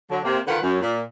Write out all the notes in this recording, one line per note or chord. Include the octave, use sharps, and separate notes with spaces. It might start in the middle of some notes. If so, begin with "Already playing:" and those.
D3 F#3
C3 A#3
D3 D#3 F4 B4 F#5
F#2
A#2